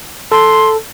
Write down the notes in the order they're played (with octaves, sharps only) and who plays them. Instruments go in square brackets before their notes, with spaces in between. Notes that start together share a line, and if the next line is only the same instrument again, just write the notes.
[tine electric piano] A4 [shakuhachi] C6